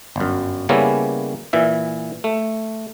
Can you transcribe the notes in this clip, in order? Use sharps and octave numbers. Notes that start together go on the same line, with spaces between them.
G1 F#2
C#3 G3 A#3 B3 C#4 E4
A#2 E3 E5
A3